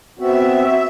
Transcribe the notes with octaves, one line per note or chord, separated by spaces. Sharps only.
B3 C4 F#4 E5